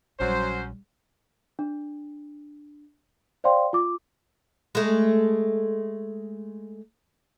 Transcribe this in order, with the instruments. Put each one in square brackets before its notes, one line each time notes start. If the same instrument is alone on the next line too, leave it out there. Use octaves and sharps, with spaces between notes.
[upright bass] A#1 G3 [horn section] F#3 C#4 C5
[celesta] D4
C5 D5 F5 G5 C6
F4 D6
[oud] G#3 A3